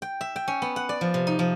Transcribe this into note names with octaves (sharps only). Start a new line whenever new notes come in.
G5
E5
G5
C#4
B3
F#5
D5
F3
C3
D#4
F3